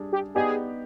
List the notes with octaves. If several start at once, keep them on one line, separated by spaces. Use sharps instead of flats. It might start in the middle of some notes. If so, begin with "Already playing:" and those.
Already playing: G3 D4 G#4
G4
B3 D#4 G4 G#4 D5